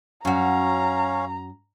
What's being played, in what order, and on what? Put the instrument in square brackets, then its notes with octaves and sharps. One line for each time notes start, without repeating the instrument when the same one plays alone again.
[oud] F#2 F#4 [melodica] C#4 C#5 F5 [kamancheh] A#5